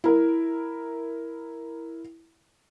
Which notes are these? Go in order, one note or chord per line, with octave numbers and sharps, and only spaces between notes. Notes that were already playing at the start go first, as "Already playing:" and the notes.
E4 A#4